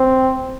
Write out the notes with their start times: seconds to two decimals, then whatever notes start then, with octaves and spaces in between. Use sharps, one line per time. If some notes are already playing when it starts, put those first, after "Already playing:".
Already playing: C4